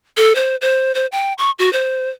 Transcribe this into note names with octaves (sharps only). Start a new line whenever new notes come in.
A4
C5
C5
C5
G5
C#6
F#4
C5